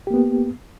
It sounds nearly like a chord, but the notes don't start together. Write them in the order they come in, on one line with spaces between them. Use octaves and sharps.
G4 A#3 B3